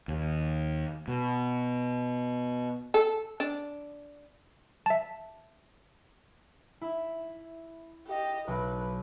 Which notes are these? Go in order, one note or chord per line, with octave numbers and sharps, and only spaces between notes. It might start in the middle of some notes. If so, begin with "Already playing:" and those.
D#2
B2
A4
D4
E5 A5
E4
G4 D#5
B1 B4